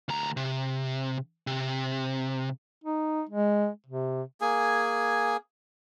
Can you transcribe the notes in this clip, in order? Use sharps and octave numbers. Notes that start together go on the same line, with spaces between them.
D2 A#5
C3
C3
D#4
G#3
C3
A#3 G#4 G#5